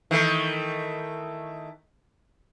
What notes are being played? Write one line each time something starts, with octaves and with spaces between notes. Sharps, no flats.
D#3 E3 A3